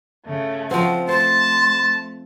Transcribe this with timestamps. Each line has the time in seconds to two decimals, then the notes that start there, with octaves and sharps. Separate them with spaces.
0.25 C#3 A3
0.71 F3 C4 F#5
1.09 A3 C5 A5 C6